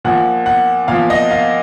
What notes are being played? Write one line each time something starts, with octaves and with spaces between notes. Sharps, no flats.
A#2 F3 F#5
F#5
A#2 F3 F5
D#5
F5